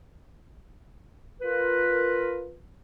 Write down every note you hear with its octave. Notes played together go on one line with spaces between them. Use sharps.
F4 A#4 B4